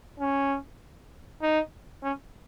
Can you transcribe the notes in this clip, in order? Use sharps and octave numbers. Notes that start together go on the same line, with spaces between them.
C#4
D#4
C#4